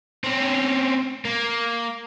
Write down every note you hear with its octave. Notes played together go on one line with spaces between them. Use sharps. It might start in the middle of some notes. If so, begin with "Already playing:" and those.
C4 C#4
A#3